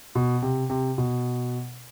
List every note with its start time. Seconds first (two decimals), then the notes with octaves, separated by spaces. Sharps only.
0.15 B2
0.42 C3
0.70 C3
0.98 B2